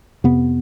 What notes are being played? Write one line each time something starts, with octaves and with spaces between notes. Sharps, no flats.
F2 C3 B3